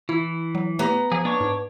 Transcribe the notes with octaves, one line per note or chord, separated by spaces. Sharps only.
E3 E4
F#3
A3 B3 G4 A#5 A#6
F3 G#4
A#3 D4 C#5
G#2